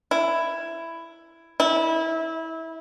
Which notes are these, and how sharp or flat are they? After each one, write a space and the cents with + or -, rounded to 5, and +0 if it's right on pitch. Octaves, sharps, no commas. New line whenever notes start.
E4 +10
E4 -25